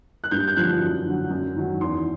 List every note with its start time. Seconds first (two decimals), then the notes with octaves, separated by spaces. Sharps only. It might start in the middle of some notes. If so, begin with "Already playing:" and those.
0.24 F#6
0.31 G2 G6
0.47 G6
0.57 D3 F3 F#6
0.81 F#2
1.06 D3 F#3
1.31 F#2
1.56 D#3 F#3
1.81 E2 C6